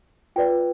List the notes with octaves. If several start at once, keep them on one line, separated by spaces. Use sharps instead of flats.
F4 B4 D5 G5